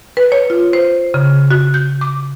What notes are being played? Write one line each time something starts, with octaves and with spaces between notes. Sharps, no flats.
B4
C#5
F4
C5
C#3
F#4
G6
D6